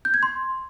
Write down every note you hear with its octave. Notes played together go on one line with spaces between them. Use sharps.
G6
G#6
C6